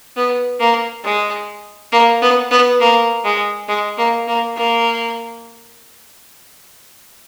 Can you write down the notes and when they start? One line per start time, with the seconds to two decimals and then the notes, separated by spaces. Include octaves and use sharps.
0.17 B3
0.60 A#3
1.04 G#3
1.92 A#3
2.22 B3
2.51 B3
2.80 A#3
3.24 G#3
3.68 G#3
3.98 A#3
4.27 A#3
4.57 A#3